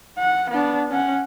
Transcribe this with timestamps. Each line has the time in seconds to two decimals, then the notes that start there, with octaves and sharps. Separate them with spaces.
0.18 F#5
0.51 B3 D4
0.90 C#4 F#5